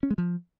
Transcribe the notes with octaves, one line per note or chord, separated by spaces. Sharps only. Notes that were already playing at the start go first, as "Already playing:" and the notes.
C#4
G#3
F3